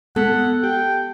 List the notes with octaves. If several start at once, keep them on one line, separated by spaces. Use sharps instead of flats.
G#3 B3 A4 F#5
G4 G5